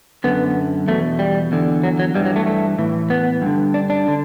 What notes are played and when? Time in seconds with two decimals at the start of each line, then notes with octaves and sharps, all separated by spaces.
0.24 F#2 D3 B3
0.88 E2 B2 A3
1.19 G3
1.52 E2 D3
1.84 F#3
1.99 F#3
2.15 G2 E3 G3
2.25 F#3
2.36 A3
2.46 A3
2.78 A2 E3
3.10 B3
3.42 G2 D3
3.74 D4
3.90 D4
4.08 D3